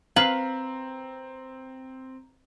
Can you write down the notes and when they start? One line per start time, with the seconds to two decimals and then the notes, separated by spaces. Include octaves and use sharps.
0.16 C4 B4 F5 A#5